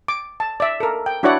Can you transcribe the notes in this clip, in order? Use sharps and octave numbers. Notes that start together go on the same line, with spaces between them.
D6
A5
D5 E5
A4 A#4
G5
D4 E4 F#4 C#5 D5 F#5